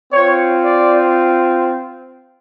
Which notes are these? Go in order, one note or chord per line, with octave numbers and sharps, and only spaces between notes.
C4 F4 C#5
D5